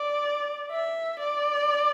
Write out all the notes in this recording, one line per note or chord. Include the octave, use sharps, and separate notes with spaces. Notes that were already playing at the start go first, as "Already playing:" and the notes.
Already playing: D5
E5
D5